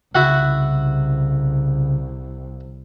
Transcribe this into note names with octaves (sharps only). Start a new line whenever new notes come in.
C2 C#3 E4 F#4 F#5